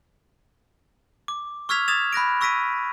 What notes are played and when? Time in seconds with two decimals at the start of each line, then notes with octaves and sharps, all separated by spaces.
1.28 D6
1.69 C#6 E6 F6 G#6 B6 F7
1.88 D#6 G#6 A6 E7 F7
2.13 B5 F#6 A#6 D7
2.41 C#6 E6 A#6 B6 D7 D#7